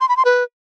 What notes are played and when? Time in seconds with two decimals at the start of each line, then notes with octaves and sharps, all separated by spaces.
0.01 C6
0.09 B5
0.17 C6
0.25 B4